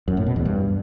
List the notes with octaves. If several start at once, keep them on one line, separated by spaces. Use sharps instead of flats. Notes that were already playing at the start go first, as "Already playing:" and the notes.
F#2
A2
B2
E2
G2